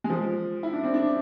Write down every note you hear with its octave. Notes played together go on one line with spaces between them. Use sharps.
G#3
F3
E4
D4
C4
D4